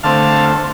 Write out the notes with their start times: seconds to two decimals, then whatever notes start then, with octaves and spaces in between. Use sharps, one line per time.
0.03 D3 A3 C4 F5 A5